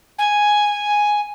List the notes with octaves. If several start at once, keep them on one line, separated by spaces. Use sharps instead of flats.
G#5